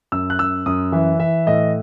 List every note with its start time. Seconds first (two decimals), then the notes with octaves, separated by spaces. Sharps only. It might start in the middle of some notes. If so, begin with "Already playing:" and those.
0.12 F#2 E6
0.30 F#6
0.39 F#2 E6
0.66 F#2 D#6
0.92 E3 E5
1.20 E3 E5
1.47 A2 D#5